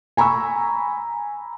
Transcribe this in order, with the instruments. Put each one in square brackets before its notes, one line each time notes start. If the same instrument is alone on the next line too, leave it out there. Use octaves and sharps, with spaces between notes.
[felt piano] G#5 A#5 B5 C#6 E6